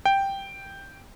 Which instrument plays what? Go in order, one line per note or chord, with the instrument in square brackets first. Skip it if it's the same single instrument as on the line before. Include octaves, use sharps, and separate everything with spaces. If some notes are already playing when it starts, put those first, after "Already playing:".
[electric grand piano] G5